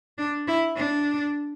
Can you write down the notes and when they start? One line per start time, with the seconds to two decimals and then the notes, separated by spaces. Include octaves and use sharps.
0.18 D4
0.47 E4
0.76 D4